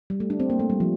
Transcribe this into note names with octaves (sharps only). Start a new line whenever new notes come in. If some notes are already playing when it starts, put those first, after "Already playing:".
G3
A3
D4
C4
A#3
A3
G3
F3